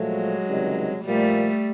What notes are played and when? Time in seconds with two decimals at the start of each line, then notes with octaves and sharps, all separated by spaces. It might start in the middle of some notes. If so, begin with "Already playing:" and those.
Already playing: A#2 F3 F#3 G#3 A3
0.48 C#2 C3 D#3 G3
1.04 A#2 F3 G3 A3 A#3